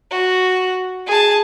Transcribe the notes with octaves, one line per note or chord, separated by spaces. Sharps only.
F#4
G#4 A5